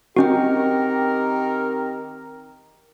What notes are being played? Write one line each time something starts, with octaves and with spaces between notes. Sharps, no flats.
D#3 C4 C#4 F#4 G4 A#4 D#5 G5